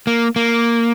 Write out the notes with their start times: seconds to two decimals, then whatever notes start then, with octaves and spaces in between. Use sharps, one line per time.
0.07 A#3
0.36 A#3